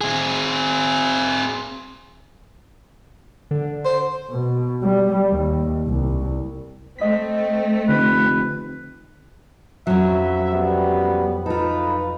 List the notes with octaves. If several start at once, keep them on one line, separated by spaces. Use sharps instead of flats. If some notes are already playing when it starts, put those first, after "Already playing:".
C4 G#4
D3
C5
B2
G3
D#2
C2
A3 C4 D#5 B6
F1 D3 B4
B1 F2 F#3 C#4 E4 E5
G3 B3
D#4 F4 A4 B4